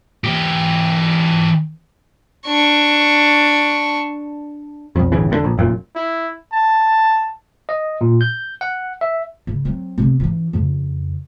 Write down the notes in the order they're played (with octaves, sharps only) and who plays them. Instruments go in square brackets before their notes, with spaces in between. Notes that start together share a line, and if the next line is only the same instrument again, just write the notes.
[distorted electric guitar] E3 G4
[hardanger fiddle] D4 C#6
[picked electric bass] B1 F2
D1 G1 C#3 E3
E1 A2 D3
A#1
F1 F#2 A#2
[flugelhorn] E4
A5
[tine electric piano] D#5
A#2
G6
F#5
E5
[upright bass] C#3
F#3 C4
C3 B3
E3 C#4
F2 C#3